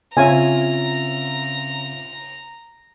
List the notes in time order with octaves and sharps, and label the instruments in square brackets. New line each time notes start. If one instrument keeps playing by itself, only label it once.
[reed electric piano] C#3 C4 C#4 [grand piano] F4 E5 [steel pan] G#5 [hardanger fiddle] A#5